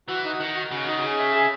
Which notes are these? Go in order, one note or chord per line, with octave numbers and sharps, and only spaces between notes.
E3 F#4
D#4
D#3 F#5
F#4
C#3 F#4
D#3 D#4
C#3
G#4
E5
G#4